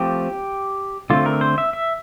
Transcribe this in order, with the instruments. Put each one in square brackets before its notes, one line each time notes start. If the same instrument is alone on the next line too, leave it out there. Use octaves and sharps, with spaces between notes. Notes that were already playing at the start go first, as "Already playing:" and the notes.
Already playing: [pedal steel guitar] F3 A3 C4 G4
D3 A3 C4 F4
A#4
C5
E5
E5